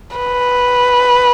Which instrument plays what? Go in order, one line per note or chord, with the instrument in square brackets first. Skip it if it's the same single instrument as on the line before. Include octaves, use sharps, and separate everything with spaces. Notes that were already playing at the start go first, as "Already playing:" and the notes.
[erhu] B4